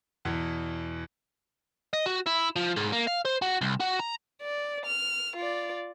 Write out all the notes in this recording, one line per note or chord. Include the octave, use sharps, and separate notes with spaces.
E2 B2 E3
D#5
F#4
E4
F3
G#2
A#3
F5
C5
F#4
C2
F#4
A#5
D5
F6
F4 D5